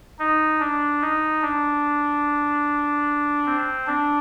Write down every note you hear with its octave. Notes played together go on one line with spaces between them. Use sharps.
D#4
D4
D#4
D4
C4
D4